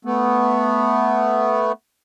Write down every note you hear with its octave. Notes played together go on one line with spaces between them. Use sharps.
A3 B3